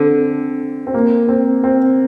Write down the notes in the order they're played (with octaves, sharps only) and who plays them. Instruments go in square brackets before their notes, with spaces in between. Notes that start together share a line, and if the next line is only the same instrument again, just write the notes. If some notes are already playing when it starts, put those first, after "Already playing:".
Already playing: [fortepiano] D3 [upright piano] C4
[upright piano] C4
A#3
C4
C4